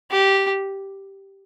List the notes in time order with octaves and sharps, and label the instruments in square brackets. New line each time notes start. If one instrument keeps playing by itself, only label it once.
[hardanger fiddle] G4